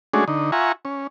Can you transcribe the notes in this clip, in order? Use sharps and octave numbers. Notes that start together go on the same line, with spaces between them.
G#3 A3 C#4 D4 F#4 G#4
D3 D#4
F4 E5 F#5 G#5 A#5 C#6
C#4